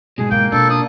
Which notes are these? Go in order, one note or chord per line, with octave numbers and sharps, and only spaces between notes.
G#2 B2 G#4
D#3 G#3 A#3 G5
B2 D4 F4 A4
D4 D#6